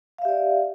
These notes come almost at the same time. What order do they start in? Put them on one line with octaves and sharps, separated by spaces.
F5 E5 G4 D5